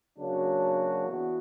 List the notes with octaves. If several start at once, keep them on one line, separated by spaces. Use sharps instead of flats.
C#3 F#3 A#3 D4 F#4
E3 B3 F#4